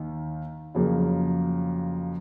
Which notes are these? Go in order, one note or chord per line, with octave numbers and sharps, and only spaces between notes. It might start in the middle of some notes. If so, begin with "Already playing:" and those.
Already playing: D#2 D#3
F2 C#3 F#3 A#3